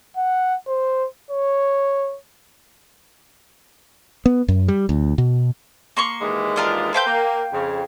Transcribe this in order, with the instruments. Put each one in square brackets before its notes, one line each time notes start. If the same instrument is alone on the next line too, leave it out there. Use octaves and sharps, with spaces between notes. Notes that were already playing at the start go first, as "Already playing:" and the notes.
[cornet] F#5
C5
C#5
[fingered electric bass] B3
F#2
G3
D2
B2
[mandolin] A#3 C6 C#6
[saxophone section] D#2 E3 G#3
[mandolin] D4 F4 A#4
[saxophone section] A4 B4 C5 [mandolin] F5 G5 G6
[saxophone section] A#3
F2 C#3